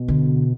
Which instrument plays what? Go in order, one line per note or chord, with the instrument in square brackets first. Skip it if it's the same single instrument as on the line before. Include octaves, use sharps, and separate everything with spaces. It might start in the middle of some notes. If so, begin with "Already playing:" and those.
Already playing: [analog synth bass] B2
[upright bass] D3